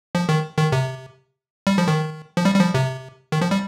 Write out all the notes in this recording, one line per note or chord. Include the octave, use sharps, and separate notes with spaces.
F3
D#3
D#3
C3
G3
F3
D#3
F3
G3
G3
F3
C3
D#3
F3
G3